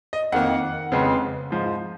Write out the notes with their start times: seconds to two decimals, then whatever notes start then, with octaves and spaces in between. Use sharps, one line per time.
0.13 D#5
0.32 F2 D#3 A#3 F#5
0.92 F2 C#3 G#3 B3
1.51 G#2 F3 G#3